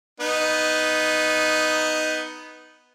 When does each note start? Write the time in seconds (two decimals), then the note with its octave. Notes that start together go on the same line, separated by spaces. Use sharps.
0.20 B3 D#4